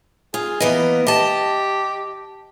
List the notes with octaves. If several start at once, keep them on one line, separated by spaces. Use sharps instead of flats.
F4 G#4
E3 A#3 B3 D#5
G4 D#5 A5